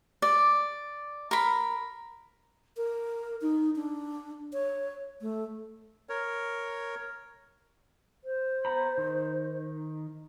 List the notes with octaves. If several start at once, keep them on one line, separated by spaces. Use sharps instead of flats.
D5
A#4 B5
A#4
D#4
D4
C#5
A3
A#4 C#5
C5
B3 A#5 B5
D#3